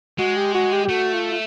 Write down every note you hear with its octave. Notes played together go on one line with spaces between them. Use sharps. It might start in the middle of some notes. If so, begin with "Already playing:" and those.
G#3 F#4
G4
F#4
G4
G4
A3 F#4
F4
F4